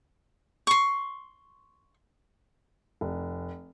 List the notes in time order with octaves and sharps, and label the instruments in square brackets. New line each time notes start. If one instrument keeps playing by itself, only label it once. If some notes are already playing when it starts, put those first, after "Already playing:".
[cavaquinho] C6 C#6
[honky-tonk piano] F1